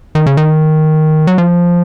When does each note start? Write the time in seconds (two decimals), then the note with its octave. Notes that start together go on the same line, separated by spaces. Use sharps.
0.15 D#3
0.26 C#3
0.37 D#3
1.27 F#3
1.38 F3